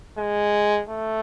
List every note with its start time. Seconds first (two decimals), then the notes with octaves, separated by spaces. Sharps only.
0.18 G#3
0.89 A3